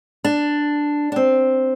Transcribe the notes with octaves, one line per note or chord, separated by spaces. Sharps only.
D4
D4
C4